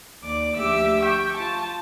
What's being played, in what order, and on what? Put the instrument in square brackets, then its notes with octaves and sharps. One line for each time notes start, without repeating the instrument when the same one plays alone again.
[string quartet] D#2 D5 D6
D2 F3 G4 E5 D6 E6
G5 C#6
F4 A5